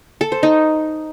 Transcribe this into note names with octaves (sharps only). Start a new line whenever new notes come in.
A4
C5
D#4